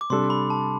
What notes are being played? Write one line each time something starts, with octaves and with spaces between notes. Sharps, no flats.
D6
C3 G3 D4 A4 C6
B5
A5